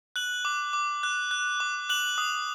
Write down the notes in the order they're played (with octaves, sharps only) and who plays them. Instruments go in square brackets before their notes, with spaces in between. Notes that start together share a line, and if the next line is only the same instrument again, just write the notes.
[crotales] F#6 F#7
D6
D6
F#6
F#6
D6
F#6 F#7
D#6